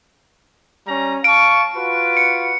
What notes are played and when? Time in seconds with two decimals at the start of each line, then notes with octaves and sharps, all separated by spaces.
0.87 G3 C#4 A#5
1.24 F5 A5 C#6 D7
1.75 F4 F#4 B4
2.17 C#7